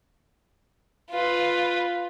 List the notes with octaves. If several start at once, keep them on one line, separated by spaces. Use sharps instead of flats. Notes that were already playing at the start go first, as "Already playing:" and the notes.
F4 B4